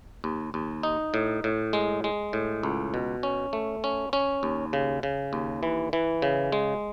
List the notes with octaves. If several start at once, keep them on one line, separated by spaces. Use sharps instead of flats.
D#2
D#2
D#4
A2
A2
G#3
G#3
A2
C#2
B2
C#4
A3
C#4
C#4
D#2
C#3
C#3
D#2
E3
E3
C#3
G#3